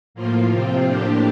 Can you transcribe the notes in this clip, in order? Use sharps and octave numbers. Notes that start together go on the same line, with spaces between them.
A2 F3 A#3 F4
C3 F3 C4 F4
A2 F3 A#3 D4 G4